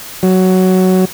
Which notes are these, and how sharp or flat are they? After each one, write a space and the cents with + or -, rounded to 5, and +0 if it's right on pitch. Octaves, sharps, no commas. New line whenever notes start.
F#3 +10